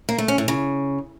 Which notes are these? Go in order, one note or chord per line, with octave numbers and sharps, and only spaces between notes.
A#3
A3
C#4
A2
C#3